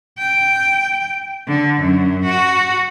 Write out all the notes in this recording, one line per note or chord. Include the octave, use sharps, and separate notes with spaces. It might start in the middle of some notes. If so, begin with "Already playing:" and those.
G5
D3
F#2
F#4